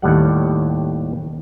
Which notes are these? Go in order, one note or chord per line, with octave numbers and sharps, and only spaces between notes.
D#2 A2 G3 F#5